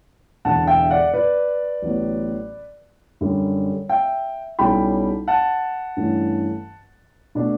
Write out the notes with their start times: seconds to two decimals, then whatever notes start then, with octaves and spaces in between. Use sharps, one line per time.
0.45 E1 E2 D3 F#5 A5
0.67 E5 G5
0.91 D5 F#5
1.14 B4 D5
1.82 A1 A2 F#3 B3
3.21 F#2 D3 G3
3.89 E5 G5
4.59 B1 B2 G3 C#4 E4 G5 B5
5.28 F#5 A5
5.97 G2 E3 A3 C#4
7.35 B2 A3 D4